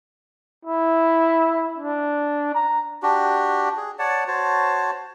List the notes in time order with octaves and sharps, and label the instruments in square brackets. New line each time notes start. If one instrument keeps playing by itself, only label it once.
[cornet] E4
D4
A#5
[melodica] D4 F#4 G4
G#4
C#5 D5 F#5 A5
F#4 C5 C#5 A5